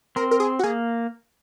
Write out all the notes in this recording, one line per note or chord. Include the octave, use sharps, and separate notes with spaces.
C4 A#4
A#4
G#4
F#4
A#3 G#4